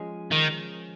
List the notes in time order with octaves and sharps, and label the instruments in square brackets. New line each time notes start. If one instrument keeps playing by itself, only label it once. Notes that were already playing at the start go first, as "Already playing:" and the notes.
Already playing: [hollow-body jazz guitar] F3 G#3 C#4 G#4
[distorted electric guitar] D#3